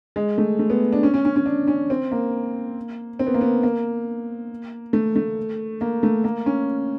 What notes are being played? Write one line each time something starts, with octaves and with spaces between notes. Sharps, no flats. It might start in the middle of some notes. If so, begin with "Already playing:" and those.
G#3
A3
A3
B3
D4
C#4
C#4
C#4
C#4
D4
C#4
C4
A#3
C4
B3
A#3
B3
A#3
A3
A3
A#3
A3
A#3
C#4